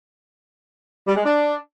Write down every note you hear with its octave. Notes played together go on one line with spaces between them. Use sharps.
G3
G#3
D4